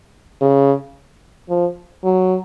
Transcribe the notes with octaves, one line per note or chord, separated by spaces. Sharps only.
C#3
F3
F#3